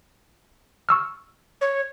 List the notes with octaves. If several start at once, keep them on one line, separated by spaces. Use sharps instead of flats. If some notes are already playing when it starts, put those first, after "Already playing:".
C#6 E6 F6
C#5